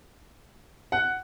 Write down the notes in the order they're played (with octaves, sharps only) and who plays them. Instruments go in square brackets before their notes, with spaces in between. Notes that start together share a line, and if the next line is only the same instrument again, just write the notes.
[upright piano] F#5